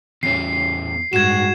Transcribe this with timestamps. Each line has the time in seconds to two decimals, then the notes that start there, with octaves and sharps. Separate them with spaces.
0.23 E2 C#4 C7
1.13 G2 G#3 F#4 G#6 E7